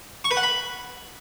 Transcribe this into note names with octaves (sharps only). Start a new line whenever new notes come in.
C#6
B4
F#5
B5